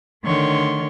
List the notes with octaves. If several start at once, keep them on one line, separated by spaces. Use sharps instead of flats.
D3 D#3 A3 C#5 C6 C#6